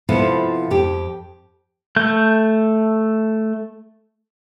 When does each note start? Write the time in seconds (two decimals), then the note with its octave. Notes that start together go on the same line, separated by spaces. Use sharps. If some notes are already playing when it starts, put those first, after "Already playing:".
0.09 C3 F3 B3 E4 F4 A4
0.71 F2 G4
1.96 A3 G6